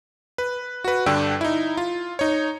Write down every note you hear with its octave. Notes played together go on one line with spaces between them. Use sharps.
B4
F#4 B4
G2 D3 D4 G5 E6
D#4 E4
F4
D#4 C#5